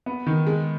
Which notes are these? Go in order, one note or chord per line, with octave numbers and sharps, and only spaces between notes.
B3
D#3
G#3